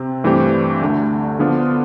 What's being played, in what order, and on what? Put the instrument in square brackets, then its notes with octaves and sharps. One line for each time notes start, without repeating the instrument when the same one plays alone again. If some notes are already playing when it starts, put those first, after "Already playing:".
Already playing: [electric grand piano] C3 C4
G2 E3 A3 C4 G4
D2 D3 A3
D3 F3 B3 D4 F4